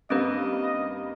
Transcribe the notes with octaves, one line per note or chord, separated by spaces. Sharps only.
G2 G3 A#3 C4 C#4 B4 D#5